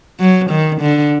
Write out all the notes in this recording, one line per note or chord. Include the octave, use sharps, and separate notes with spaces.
F#3
D#3
D3